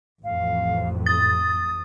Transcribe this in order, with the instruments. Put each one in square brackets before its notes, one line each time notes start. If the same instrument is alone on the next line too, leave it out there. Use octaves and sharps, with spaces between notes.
[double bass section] A1 F2 [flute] F5
[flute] D#6 [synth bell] A6